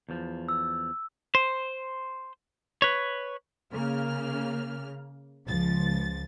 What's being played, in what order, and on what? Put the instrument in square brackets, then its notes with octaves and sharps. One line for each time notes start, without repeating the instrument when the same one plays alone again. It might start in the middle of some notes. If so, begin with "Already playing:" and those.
[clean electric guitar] E2 F3
[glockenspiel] E6
[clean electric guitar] C5
B4 C#5
[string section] C#3 A#3 F6
C#2 F3 A6